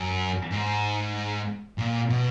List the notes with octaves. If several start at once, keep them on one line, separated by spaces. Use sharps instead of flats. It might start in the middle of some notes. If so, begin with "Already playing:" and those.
Already playing: F#2
G#2
A#2
B2